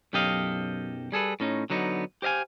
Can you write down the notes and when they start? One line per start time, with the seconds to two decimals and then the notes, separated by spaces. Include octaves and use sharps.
0.13 B1 F#2 G4 A4 D#5 F5
1.12 G3 G#4 A4 B4
1.40 A2 C#4 D#4
1.70 D3 F#3 B3 D#4
2.22 G4 C5 D#5 F5 G#5